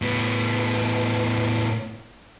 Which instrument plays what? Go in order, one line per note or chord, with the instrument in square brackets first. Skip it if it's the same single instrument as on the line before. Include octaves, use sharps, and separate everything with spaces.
[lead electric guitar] A2 B3